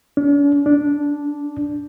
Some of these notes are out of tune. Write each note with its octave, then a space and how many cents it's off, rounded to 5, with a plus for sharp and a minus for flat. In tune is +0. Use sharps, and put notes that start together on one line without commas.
D4 -45
D4 -5